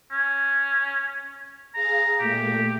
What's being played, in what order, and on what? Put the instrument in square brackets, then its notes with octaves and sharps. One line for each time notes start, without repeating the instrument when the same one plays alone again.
[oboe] C#4
[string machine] G#4 F5 [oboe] A#5
[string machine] A#2 A3 [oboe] G4